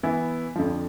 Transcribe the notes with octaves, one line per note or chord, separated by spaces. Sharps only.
E3 B3 E4
F2 D3 F3